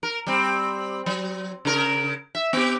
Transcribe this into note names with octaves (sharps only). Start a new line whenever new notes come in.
A#4
G3 C4
F#3
C#3 A#4
E5
B3 G4